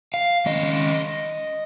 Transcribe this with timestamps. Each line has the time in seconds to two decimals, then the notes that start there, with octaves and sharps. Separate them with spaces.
0.14 F5
0.46 D#3 G#3 C#4 D#5